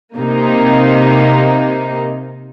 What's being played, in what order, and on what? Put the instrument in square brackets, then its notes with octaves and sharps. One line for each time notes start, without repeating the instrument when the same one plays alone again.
[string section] C3 A#3 D#4